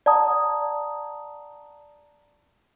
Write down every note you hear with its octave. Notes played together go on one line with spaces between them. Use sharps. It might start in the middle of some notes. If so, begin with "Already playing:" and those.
D5 F#5 A5 A#5 D#6